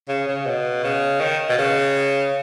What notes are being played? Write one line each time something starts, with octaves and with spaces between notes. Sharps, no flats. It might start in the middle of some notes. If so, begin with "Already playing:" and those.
C#3
C#3
B2
C#3
D#3
B2
C#3